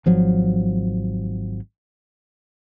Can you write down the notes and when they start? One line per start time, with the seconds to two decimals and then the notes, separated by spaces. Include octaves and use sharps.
0.06 G#1 F3 F#3